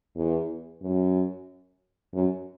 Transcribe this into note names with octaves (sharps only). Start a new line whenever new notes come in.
E2
F#2
F#2